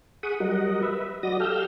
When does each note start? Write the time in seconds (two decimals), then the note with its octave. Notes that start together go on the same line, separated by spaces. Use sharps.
0.23 G#4 F#5 B5 C#6 D#6
0.40 F#3 G3 A#4 D#5 F#5
0.83 B4 E5
1.23 F#3 F#4 D5 D#5 D#6 A#6
1.40 G4 A4 F5 E6 F6 G6